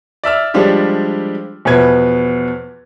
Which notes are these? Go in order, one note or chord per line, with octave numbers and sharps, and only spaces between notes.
D5 E5 E6 F6
F3 G3 G#3 D4 F4 G4
E2 B2 F3 B4 G#6